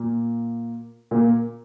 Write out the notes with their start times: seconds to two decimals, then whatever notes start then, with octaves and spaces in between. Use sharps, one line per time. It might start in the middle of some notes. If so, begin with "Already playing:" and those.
Already playing: A#2 A#3
1.11 A#2 A#3